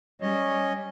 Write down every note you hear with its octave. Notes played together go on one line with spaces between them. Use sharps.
G3 C#4 C#5 D#5